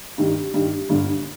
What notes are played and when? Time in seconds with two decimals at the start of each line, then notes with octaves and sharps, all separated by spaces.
0.18 G2 D#3 G3
0.54 G2 D#3 G3
0.89 G1 G2 D3